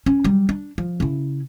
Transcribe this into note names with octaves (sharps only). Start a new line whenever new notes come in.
C#4
F#3 G3
D4
F3
C#3 E4